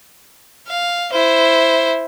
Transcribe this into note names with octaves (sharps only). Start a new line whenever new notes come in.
F5
E4 C5